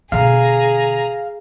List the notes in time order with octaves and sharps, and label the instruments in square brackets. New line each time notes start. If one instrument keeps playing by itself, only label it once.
[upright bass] B2 D3 [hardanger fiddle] G#4 A#5 [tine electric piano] F5